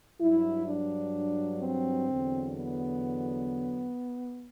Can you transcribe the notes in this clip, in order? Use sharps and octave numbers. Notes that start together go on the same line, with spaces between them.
G2 F#3 E4
D4
C4
E2 D3 F#3
B3